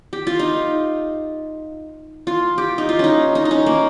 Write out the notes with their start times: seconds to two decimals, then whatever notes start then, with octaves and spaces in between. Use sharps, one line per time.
0.13 G4
0.27 F4
0.39 D#4
2.27 F4
2.58 G4
2.78 D#4
2.89 F4
2.99 C#4 D#4
3.35 D#4
3.45 D#4
3.51 C#4
3.66 A#3